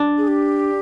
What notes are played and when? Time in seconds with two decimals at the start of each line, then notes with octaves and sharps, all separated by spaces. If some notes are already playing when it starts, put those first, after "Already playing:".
Already playing: D4
0.18 G#4
0.28 G4